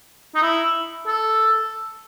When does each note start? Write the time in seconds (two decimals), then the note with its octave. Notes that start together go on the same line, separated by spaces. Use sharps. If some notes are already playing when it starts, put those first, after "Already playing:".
0.35 D#4
0.42 E4
1.07 A4